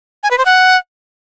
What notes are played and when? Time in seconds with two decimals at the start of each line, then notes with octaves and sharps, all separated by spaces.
0.23 G#5
0.31 B4
0.38 C5
0.46 F#5